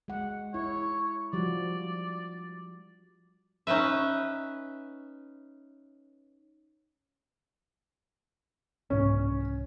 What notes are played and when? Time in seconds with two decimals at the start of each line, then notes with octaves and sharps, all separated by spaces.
0.08 G#3 F#5
0.54 E4 C#5
1.33 F3 G3 F#4 D5
3.67 C#4 D#4 B4 E5
8.90 C2 G#2 C#4